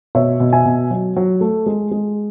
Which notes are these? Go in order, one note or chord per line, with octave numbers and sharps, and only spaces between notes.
B2 C#5 E5
B2
E5 G#5
B2
F#3
F#3
A3
G#3
G#3